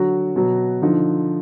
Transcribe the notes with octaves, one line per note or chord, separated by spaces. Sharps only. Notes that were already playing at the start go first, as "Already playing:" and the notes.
Already playing: D3 F#3 F#4
B2 F#3
D3 F3 D#4